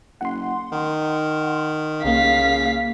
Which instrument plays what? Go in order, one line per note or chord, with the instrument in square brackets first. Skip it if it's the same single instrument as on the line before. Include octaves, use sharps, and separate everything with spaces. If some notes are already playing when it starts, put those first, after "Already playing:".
[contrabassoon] F#1 [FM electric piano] F#5 C6
[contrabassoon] D#3
[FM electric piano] C2 A#3 [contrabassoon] C#3 [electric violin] F5 B6